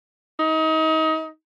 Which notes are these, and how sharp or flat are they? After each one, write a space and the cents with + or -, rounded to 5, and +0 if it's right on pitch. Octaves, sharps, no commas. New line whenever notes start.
D#4 +30